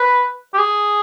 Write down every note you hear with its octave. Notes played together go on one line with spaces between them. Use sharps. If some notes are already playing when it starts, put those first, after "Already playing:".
Already playing: B4
G4
G#4